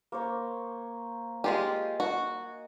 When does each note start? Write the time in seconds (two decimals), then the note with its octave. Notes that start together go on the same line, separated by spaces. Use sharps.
0.12 A#3 C5 C#5
1.44 G#3 F4 G4 D#5 G#5
2.00 F#4